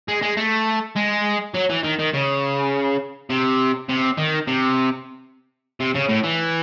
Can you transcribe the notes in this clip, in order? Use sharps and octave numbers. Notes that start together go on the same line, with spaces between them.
G#3
G#3
A3
G#3
F#3
E3
D#3
D#3
C#3
C3
C3
D#3
C3
C3
C#3
A2
E3